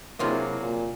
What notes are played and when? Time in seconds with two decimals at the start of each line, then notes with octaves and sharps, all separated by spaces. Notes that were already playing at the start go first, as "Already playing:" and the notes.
0.19 C3 F#3 A#3 D4 E4 F4 G#4 D#5
0.60 A#2